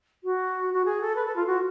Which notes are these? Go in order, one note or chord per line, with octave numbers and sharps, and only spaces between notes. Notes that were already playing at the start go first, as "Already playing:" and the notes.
F#4
F#4
G#4
A4
B4
A4
F4
F#4